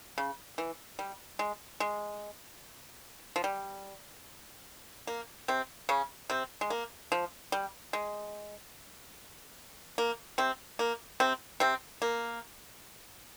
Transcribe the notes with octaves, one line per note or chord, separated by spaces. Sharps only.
C#3
E3
G3
G#3
G#3
F3
G3
A#3
C3 C4
C#3 C#4
C3 C4
G#3
A#3
F3
G3
G#3
A#3
C3 C4
A#3
C3 C4
C3 C4
A#3